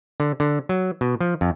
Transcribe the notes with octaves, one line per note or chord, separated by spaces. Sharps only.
D3
D3
F#3
B2
F3
F2